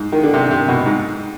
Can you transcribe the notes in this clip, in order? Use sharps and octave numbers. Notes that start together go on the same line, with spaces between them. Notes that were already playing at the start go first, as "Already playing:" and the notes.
Already playing: G#2
D#3
D3
C3
C3
B2
G#2